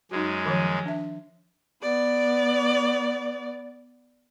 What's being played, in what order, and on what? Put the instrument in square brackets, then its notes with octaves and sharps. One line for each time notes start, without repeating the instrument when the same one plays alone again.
[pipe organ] F#2 G#3 [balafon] D#4 F#4
[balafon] D#3 F3 C#5
D4 E5
[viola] B3 D5